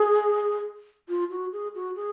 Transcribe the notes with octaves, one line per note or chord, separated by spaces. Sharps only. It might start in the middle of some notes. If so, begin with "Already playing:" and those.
Already playing: G#4
F4
F#4
G#4
F#4
G#4